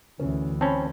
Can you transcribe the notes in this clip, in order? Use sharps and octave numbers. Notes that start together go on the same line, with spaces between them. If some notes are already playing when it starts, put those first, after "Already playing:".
D2 E3 C#4
C4 C#4 A5 B5